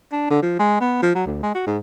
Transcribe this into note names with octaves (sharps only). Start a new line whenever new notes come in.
D4
D3
F3
G#3
B3
F3
F#3
D2
G#3
F#4
G#2